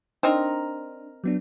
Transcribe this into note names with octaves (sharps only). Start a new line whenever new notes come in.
C4 D4 D#4 A#4
F#3 B3 D4